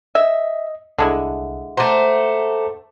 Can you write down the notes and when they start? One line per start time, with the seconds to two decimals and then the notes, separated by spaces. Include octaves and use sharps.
0.15 D#5 E5
0.98 C2 D3 G#3 E4
1.77 A3 C5 F#5 A#5 D6